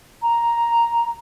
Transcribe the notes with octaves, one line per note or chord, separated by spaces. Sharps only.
A#5